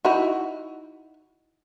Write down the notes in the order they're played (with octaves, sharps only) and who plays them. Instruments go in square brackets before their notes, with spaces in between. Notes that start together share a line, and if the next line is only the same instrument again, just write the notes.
[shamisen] D#4 E4 F#4